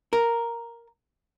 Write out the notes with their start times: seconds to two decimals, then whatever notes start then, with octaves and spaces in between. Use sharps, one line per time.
0.13 A#4